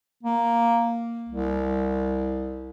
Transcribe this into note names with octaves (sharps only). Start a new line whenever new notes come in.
A#3
C2